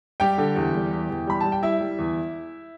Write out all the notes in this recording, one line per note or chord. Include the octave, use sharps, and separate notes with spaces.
G3 G4 G5
D3
E2
G3
E2
E2
G3 B5
G3 A5
G5
G3 E4 E5
G3
E2